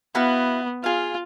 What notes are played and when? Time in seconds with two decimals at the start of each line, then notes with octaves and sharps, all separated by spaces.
0.15 B3 E4 F#4 F5
0.84 F4 G#4 F5